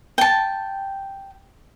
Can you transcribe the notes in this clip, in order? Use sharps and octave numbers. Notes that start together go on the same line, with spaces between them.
G5 A5